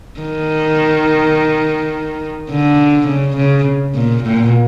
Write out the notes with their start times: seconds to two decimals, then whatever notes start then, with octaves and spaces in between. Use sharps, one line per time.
0.20 D#3
2.50 D3
3.07 C#3
3.37 C#3
3.95 A#2
4.23 A#2